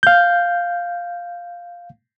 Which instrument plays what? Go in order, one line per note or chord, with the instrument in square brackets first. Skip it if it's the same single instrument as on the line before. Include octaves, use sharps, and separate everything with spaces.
[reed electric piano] F5 G6